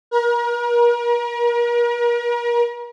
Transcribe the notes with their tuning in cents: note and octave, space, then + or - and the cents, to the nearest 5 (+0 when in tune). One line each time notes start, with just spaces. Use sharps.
A#4 +40